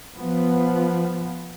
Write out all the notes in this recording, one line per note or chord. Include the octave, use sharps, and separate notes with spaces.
F3 B3